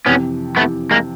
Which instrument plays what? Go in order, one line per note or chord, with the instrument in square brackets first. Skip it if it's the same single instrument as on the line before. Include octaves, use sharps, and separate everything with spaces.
[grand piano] F2 C3 E3 [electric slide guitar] B3 C#4
[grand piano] F2 C3 E3 [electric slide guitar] A3 B3
[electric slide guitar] G#3 A#3